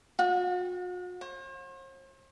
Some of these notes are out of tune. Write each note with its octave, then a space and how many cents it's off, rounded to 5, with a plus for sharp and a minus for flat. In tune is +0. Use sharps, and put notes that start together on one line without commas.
F#4 -45
C5 +45